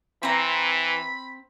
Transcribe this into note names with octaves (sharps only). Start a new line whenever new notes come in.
E3 C4 A#5 B5